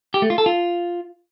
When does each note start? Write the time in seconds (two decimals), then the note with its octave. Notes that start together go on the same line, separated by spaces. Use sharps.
0.14 G4
0.22 A3
0.30 F4
0.38 A4
0.46 F4